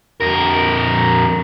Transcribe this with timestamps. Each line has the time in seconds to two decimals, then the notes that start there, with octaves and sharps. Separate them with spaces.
0.21 F2 A#4